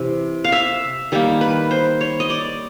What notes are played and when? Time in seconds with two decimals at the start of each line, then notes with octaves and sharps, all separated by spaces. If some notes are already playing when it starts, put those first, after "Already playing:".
Already playing: C3 E3
0.44 F5
0.52 E5
1.12 D#3 G3 A#3
1.41 B4
1.71 C5
2.01 C#5
2.20 D#5
2.30 D5